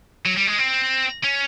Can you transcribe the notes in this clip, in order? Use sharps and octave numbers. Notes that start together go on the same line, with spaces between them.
F#3
G3
G#3
C4
C#4